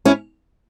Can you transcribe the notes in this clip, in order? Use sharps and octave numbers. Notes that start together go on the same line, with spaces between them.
C#4 E4